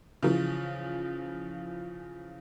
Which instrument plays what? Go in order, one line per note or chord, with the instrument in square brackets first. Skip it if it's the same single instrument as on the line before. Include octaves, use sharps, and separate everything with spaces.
[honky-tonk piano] C#3 E3 F3